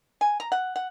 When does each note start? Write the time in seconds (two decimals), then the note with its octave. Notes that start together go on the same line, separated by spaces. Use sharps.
0.21 G#5
0.40 A#5
0.52 F#5
0.76 F#5